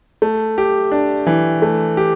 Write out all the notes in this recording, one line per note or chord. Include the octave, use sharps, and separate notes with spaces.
A3
G4
D4
E3
A3
G4